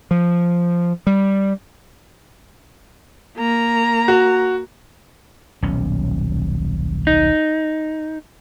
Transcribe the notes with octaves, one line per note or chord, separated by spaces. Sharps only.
F3
G3
A#3 A#5
F#4
D#1 B1 C#4
D#4